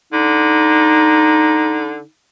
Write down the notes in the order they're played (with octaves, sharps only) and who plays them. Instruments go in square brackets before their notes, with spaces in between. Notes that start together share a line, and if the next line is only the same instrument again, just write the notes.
[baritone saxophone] D3 [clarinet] D#4